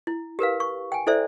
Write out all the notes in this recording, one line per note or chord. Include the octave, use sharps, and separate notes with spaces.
E4
G4 A#4 B4 F5
C#6
G5 G#5
E4 A4 C5 D5 E5